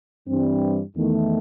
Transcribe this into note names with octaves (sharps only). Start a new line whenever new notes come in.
G2 E3 G3 C4
E2 D#3 A3